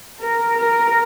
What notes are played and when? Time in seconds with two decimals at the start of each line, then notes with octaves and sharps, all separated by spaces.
0.20 A#4
0.57 A#4